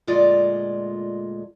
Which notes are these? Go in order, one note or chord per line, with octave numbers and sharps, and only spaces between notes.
D2 A#2 G#3 F4 D5 D#5